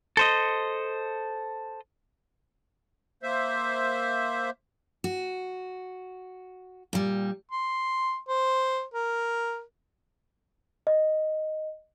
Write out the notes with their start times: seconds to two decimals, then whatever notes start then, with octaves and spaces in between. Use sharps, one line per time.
0.17 A4 C5 D#5
3.23 A#3 C5 E5
5.04 F#4
6.93 A#2 G3
7.51 C6
8.29 C5
8.94 A#4
10.87 D#5